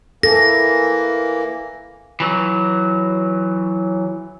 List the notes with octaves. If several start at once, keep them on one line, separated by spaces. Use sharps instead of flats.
E3 A#3 A4 A#6
E3 F#3